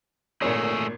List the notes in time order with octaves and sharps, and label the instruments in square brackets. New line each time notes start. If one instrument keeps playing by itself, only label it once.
[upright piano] G#1 A#2 C#5 [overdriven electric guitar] A3 G#4